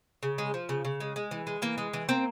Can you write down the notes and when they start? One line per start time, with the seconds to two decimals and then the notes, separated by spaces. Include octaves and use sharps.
0.23 C#3
0.38 G#3
0.54 F3
0.69 C#3
0.85 C#3
1.00 G#3
1.16 G#3
1.31 E3
1.47 G#3
1.62 E3 A#3
1.78 G#3
1.94 E3
2.09 A#3 C4